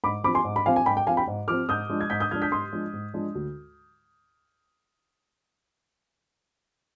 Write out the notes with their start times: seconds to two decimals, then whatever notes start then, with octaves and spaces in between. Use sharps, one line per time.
0.04 G#2 B5 D6
0.24 F3 C4 B5 D6
0.35 G#5 C6
0.44 G#2
0.56 B5
0.66 F3 C4 F5 G#5
0.76 G#5
0.86 G#2 G5 B5
0.97 G5
1.07 F3 C4 F5 G#5
1.17 G5 B5
1.27 G#2
1.48 F3 C4 D6 F6
1.68 G#2 D#6 G6
1.90 F3 G#3 D4
2.00 G#6
2.10 G#2 G6 B6
2.20 D#6 G6
2.31 F3 G#3 D4 F6 G#6
2.42 G6 B6
2.51 G#2 C6 D#6
2.72 F3 G#3 D4
2.93 G#2
3.14 F3 G#3 D4
3.35 D2